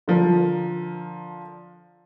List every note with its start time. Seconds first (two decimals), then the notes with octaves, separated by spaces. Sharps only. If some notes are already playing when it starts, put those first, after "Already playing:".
0.08 D3 F3 A#4